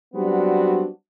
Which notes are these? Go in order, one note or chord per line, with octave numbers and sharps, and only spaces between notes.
F#3 G3 B3 C4 D4 F#4